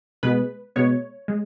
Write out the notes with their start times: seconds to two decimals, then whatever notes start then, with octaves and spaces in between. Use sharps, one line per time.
0.23 B2 G#3 B3 B4
0.76 B2 G#3 B3 C#5
1.28 G#3